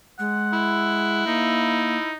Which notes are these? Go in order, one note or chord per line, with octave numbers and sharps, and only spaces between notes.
G#3 F#5
E4
A#3 D#4